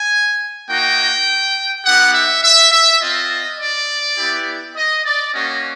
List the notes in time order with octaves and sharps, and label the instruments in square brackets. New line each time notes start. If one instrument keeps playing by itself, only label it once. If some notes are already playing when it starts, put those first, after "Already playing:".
Already playing: [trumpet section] G#5
A#3 D#4 F#4 G5
B3 D#4 G4 F#5
E5
E5
E5
C4 F4 D#5
D5
B3 E4 G4
D#5
D5
A#3 C#4 F#4 D#5